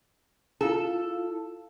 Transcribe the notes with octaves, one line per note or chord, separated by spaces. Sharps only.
E4 F4 A4 F5